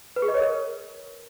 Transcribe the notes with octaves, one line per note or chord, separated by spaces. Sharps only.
B4
G#4
D#5
C#5
A#4